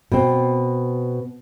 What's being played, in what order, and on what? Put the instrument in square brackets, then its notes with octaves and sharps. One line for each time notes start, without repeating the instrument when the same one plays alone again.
[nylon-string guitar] B2 C4